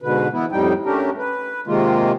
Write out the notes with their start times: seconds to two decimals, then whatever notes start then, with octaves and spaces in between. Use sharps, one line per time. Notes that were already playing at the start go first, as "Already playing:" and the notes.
0.02 G#2 B2 D3 B4
0.33 E3 B3 E4
0.52 F2 A2 G3 D#4 G5
0.85 A3 C#4 D4 G4 A#4
1.18 B4
1.67 C3 D#3 G#3 A#3 F4